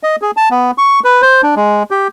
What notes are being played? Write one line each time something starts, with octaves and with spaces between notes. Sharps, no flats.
D#5
G#4
A5
B3
C#6
B4
C5
D4
G#3
G4